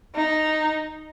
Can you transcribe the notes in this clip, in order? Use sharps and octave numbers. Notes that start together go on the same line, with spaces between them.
D#4